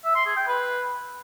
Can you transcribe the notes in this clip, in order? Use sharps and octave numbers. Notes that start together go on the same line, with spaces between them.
E5
C6
G#4
G5
B4